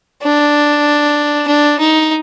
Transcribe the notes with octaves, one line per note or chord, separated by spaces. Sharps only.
D4
D4
D#4